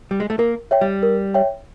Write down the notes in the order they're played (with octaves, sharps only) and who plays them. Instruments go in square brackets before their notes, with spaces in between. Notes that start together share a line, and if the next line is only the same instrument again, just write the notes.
[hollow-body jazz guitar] G3
G#3
A3
[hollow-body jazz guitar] A#3 [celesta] A#4
[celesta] C#5 E5 G5
[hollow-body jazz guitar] G3
[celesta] A#4
C#5 E5 G5